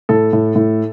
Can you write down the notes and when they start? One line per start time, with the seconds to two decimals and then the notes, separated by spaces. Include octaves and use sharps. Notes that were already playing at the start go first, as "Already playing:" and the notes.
0.09 A2 A4
0.33 A2
0.56 A2